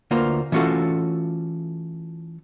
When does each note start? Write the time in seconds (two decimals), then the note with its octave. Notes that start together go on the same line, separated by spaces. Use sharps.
0.11 D2 A#3 F4 B4 C5
0.52 E3 A3 C#4 F4 F#4 A4